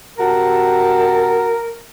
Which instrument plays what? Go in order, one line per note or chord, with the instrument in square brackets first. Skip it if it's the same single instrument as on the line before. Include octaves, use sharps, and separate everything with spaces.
[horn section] C3 F#4 A5 [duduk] A#4